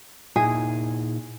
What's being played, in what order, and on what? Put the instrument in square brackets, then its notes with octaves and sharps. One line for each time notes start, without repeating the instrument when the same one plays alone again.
[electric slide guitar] A#2 D#4 E4 [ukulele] G#4